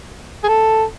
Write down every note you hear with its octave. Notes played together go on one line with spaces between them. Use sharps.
G#4
A4